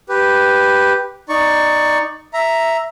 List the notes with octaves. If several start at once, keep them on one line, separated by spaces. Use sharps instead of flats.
G4 B4
D#4 D5 C#6
E5 A#5